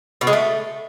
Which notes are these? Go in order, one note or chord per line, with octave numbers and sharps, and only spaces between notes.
B2
G#3
A3